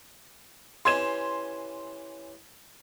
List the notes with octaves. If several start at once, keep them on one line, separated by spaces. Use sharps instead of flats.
E3 C#4 G4 C6 G#6 E7